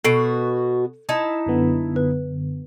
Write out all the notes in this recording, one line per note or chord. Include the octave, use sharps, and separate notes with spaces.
B2 F#4 A4 C7 D7
D#4 E4 A5
F#2 D3 B3
B4